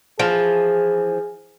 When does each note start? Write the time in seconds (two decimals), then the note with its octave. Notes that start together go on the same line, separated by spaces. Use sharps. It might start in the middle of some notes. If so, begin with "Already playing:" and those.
0.19 E3 F3 G#4